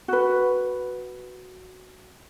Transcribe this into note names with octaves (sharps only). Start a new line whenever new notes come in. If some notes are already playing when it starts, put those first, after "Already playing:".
F#4 B4